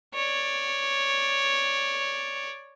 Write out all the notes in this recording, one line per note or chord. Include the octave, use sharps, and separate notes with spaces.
C#5 D5